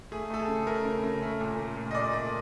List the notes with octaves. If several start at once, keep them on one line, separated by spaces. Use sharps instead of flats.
A3 G#4
A3 A4
G#4
C#3
A3 A#4
C#3
C#3
A3
A#2
A3
A#2
D#5
A#2 D5
A3 D5